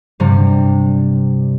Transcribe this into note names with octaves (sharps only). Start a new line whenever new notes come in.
G2 C3 G3